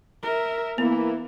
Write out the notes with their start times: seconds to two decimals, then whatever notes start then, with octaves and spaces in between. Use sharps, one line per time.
0.23 A#4 E5
0.78 E3 A#3 B3 E4